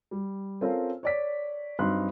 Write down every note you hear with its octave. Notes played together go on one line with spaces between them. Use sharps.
G3
C4 C#4 F4 A4 A#4 C5
C#5 D5 B6
G2 F#3 C4 D#4 C6 F#6